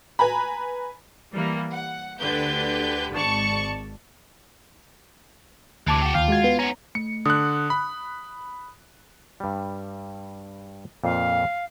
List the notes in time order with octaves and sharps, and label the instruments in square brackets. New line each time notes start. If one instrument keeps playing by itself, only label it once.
[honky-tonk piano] B4 G#5 A#5 B5
[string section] E3 G3 A#3
F#5
D2 D3 G4 B4 G6
G#1 D5 A5 C#6 C#7
[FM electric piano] D2 A5 D6 [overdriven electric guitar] C3 E3
[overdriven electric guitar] F#4 G4
[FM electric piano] D#2 G5 F6 [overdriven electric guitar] F4
[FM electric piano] G#3 F#4 G#6
B3
[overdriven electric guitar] B3 C#4 [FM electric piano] A#5
[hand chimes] A3 [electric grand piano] C#7
[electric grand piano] D3 F#6 [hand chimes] D#6
[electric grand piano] B5
[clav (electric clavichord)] G2 G3
[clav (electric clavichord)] F2 A#2 [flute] F5